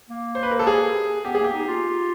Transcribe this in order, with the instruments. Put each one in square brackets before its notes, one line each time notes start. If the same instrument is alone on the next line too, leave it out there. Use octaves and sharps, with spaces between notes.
[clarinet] A#3
[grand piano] C5
B4
A#4
A4
G#4
[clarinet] B3 [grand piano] G4
[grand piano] G#4
[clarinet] A#3 [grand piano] G4
[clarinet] D#4
F4